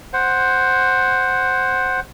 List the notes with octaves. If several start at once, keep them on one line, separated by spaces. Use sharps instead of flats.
C5 F#5